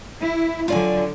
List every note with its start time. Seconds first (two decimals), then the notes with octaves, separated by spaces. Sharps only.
0.20 E4
0.68 D3 F#3 F4 D5 G#5